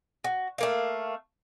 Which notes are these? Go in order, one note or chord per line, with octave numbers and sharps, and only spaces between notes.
F#4
A3 A#3 F5